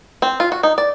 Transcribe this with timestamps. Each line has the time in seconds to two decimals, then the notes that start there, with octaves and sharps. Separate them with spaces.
0.22 C4
0.40 F4
0.52 F#4
0.63 D#4
0.78 D5